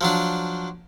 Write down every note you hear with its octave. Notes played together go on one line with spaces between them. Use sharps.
F3 F#3 D4